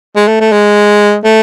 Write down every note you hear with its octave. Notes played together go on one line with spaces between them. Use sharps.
G#3
A3
A3
G#3
A3